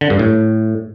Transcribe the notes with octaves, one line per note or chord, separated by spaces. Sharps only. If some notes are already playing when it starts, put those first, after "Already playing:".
D3
G2
A2